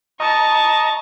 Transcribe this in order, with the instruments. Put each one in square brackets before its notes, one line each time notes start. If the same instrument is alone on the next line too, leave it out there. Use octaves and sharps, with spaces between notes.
[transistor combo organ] D#5 A#5 [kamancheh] A5 C#6